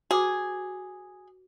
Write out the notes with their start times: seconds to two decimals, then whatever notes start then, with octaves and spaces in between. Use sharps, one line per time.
0.11 F#4 G#4 B4 D6